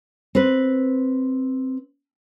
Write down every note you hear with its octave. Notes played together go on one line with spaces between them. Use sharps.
C4 B4